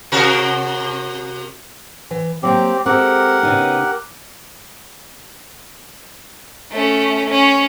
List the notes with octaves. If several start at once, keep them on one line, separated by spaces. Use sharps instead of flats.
C3 F#4 A#4
E3
F#3 A#3 C4 G4 A#5
G#3 C4 G4 A4 A#4 F#5
C#3 B3 D#4
A3 C#4
C#4